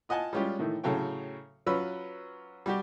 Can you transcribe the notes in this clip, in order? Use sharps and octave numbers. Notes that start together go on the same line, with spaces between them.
F4 D#5 F#5 G#5 A5
G3 G#3 C#4 F4 G4
A2 D#3 E3 A3
A2 C#3 F#3 A4 C#5 G5
F#3 C#4 F4 B4 B5 E6
G3 F#4 G4